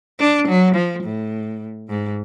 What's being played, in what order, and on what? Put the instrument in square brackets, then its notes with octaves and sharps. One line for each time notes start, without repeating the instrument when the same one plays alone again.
[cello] D4
F#3
F3
A2
G#2